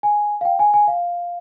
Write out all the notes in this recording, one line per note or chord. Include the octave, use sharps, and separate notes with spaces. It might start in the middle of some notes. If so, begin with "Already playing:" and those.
G#5
F5
G5
G#5
G#5
F5